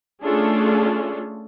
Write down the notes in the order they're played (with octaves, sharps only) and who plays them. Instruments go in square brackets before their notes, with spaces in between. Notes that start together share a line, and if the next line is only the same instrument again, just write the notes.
[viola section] A3 C#4 D4 F4 G#4 A4